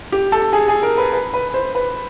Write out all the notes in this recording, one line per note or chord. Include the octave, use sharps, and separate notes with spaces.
G4
A4
G#4
G#4
A#4
B4
B4
B4
C5
B4